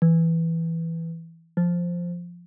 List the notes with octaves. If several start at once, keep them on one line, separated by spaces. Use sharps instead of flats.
E3
F3